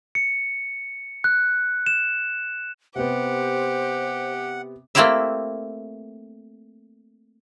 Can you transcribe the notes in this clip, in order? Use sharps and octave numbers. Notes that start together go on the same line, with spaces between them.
C#7
F#6
E7
C3 B3 G4 C5 F#5
A3 A#3 C4 E4 G4 E5